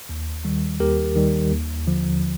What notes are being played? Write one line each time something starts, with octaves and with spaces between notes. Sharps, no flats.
D#2
D#3 G3
D#2 G4 A#4
D#3 G3
D#2
D3 F3